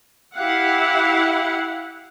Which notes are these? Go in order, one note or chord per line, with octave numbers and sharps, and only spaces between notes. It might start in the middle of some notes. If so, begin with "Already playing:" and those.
E4 G4 F5 F#5